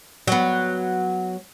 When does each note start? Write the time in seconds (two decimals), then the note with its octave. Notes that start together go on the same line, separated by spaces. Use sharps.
0.27 F#3 B3